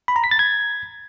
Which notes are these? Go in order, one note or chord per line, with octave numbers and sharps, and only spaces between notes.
B5
A#5
B6
A6
G#6